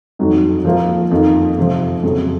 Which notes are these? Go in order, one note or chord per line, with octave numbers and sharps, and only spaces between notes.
F2 D#3 F#3
F3 A#3 F4
F2 D#3 A#3 F4
F2 C3 F3
F2 C#3 F#3